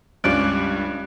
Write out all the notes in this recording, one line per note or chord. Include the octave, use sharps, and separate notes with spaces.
C#2 G2 C#4 D5 F#6